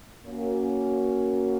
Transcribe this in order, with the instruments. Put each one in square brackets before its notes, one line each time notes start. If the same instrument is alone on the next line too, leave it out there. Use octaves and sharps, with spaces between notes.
[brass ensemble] A#3 C#4 F#4